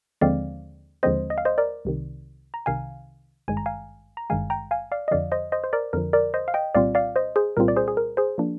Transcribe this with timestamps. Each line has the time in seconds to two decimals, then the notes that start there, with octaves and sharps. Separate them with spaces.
0.21 D#2 D3 F3 G#3 C4 D5 F5
1.03 D#2 D3 F3 G#3 C4 C5 D#5
1.30 D#5
1.38 F5
1.45 C5 D#5
1.58 A#4 D5
1.85 C2 C3 D#3
2.54 A#5
2.66 C2 C3 D#3 F5 G#5
3.48 G#1 G2 D#3 G#3 G#5
3.57 A#5
3.66 F5 G#5
4.17 A#5
4.30 G#1 G2 D#3 G#3 F5 G#5
4.50 G5 A#5
4.71 F5 G#5
4.92 D5 F5
5.08 D#5
5.11 F2 D3 F3 D5 F5
5.32 C5 D#5
5.52 C5 D#5
5.64 C5
5.73 A#4 D5
5.93 F2 D3 F3 A#4
6.13 A#4 D5
6.34 C5 D#5
6.48 F5
6.54 D#5 G5
6.75 C2 A#2 G3 C4 F4 D5 F5
6.95 D5 F5
7.16 C5 D#5
7.36 G#4 C5
7.57 C2 A#2 G3 C4 F4 A#4
7.68 D5
7.76 G#4 C5
7.88 G#4
7.97 A#4
8.17 G#4 C5
8.38 F3 A#3 D4